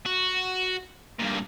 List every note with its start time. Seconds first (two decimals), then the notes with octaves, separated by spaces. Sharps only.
0.06 F#4
1.19 G2 A#2